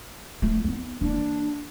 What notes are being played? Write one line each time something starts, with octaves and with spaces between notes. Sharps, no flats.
A3 F4
B3 D#4
E3 A#3 D4